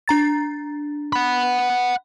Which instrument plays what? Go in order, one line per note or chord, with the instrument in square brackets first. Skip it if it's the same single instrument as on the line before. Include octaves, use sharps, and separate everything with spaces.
[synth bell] D4 A#5 A6
[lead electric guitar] F#5 B5